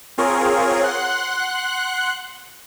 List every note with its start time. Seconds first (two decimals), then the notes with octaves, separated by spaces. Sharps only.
0.18 C4 F4 G#4 A#4 C#5
0.84 F#5 C6 F#6